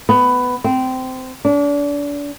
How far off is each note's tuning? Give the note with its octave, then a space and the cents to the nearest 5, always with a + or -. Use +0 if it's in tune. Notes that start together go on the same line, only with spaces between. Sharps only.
B3 +10
C4 -20
D4 -35